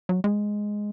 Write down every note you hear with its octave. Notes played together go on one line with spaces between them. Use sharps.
F#3
G#3